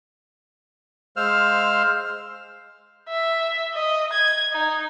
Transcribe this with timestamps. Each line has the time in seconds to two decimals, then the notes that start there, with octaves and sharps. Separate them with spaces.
1.17 G#3 C5 F5 E6 F6
3.08 E5
3.74 D#5
4.13 G#6
4.52 D#4